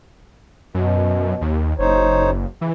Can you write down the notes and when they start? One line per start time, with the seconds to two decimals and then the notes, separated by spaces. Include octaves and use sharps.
0.74 F#2 B2
1.41 D#2
1.79 F#1 D#4 C5 C#5
2.61 C#3 E3